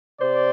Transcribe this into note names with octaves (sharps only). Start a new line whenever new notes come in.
C3 C5 D5